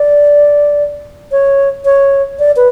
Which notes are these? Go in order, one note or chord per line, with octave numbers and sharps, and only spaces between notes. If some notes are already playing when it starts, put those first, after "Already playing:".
Already playing: D5
C#5
C#5
D5
B4